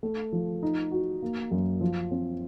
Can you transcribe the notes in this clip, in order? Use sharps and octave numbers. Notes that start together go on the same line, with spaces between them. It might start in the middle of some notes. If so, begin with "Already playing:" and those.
A3
F3
D#4
F#4
A#3
F#2
F3
C4